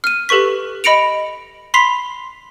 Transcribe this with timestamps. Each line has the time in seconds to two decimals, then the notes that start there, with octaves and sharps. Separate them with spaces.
0.04 F6 D#7
0.29 G4 A4 B4 C#6 B6
0.84 D#5 B5 A#6 C#7 D7 F7
1.74 B5 C6 B6 C7 F7